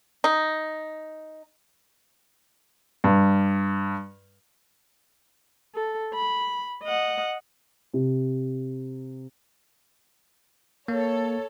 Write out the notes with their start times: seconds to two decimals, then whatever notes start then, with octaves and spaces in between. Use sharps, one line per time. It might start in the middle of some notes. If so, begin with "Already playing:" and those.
0.24 D#4
3.04 G2
5.75 A4
6.14 B5
6.84 D#5 F#5
7.94 C3
10.88 A#3 A4 C#5